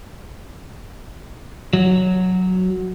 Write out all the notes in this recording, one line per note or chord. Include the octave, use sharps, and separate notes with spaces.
F#3